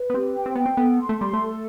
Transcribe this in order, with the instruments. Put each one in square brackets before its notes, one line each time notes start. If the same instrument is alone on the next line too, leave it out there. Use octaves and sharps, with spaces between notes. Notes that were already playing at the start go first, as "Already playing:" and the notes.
Already playing: [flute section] B4
[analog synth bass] B3
[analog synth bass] C4 [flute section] G4
[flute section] G5
[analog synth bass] C4
[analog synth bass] B3 [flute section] G5
[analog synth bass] C4
[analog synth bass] B3 [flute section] A4
[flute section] C6
[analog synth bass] A3
[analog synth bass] G3 [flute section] C6
[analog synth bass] A3
[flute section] A4